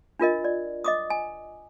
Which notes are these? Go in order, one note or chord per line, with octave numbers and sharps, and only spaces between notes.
D4 F4 A#4 D#5
D5
D#5 D6 D#6
G#5